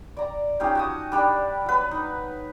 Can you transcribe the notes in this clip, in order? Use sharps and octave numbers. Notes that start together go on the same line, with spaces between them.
D5 A#5
C#4 D#4 F4 G4
F#4 A5 D#6
G3 D4 D5 B5
F#3 B4
D#4